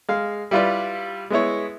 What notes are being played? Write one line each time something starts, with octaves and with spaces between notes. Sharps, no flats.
G#3 F5
G3 E4 F4 B4 D5
G#3 B3 E4 C#5